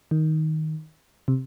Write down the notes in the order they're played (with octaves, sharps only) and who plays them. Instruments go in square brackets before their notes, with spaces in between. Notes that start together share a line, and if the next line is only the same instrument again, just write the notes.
[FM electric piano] D#3
C3